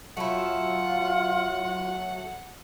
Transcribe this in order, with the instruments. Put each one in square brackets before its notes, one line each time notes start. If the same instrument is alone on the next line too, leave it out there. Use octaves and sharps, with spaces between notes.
[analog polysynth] F#3 [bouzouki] A3 E4 [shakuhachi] F4 [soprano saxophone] F#5